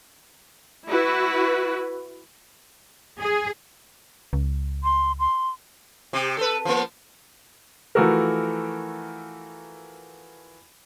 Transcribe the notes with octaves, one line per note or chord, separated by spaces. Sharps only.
E4 F#4 B4
G#4
C#2
C6
C6
C3 G4
A4 B4
F3 A#3
E3 F3 A3 F#4 A4 A#4